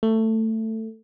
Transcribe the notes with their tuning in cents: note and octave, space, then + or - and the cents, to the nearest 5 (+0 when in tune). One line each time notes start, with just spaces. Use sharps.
A3 +15